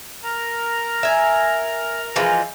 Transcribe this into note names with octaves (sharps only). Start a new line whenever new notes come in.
A#4 A#5
E5 G#5
E3 F3 G#3